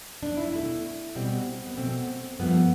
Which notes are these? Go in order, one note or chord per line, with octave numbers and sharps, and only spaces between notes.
D4
E4
B2 A3 E4
B2 G3 C4
B3
B2 A3 C4
G2 F3 A3 B3